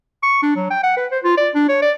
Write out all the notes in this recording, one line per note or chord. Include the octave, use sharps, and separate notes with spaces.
C#6
D4
F#3
G5
F#5
B4
C5
F4
D5
D4
C#5
D5